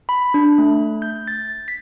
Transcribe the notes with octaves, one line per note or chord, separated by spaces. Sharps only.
B5
D4
A3
G6
A6
B6